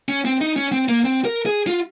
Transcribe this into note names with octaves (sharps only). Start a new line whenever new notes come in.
C#4
C4
D#4
C#4
C4
A#3
C4
A#4
G#4
F4